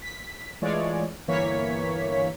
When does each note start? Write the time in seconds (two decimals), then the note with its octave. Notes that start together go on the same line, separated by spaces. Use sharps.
0.02 B6
0.62 E3 G#3 A3 F4 C#5 D5
1.27 G1 E3 A#3 C#5 B6